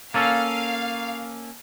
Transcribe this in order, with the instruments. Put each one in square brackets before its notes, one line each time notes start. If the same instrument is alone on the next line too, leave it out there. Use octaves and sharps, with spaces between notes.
[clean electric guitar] A#3 C#4 A4 [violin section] F5